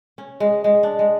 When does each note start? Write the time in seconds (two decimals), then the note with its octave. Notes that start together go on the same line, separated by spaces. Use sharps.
0.18 C#4
0.40 G#3
0.64 G#3
0.83 D4
0.99 G#3